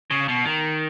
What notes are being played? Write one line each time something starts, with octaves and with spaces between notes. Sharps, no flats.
C#3
B2
D#3